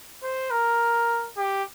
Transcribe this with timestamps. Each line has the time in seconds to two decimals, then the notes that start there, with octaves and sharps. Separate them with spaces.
0.23 C5
0.51 A#4
1.37 G4